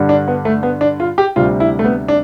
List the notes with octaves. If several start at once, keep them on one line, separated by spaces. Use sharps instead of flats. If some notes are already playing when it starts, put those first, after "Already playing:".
Already playing: G2 D3 G3
D4
B3
A3
B3
D4
F4
G4
D2 C3 G3 F4
E4
A3
B3
D4